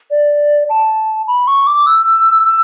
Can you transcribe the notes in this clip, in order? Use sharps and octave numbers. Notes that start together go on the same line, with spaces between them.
D5
A5
B5
C#6
D6
E6
E6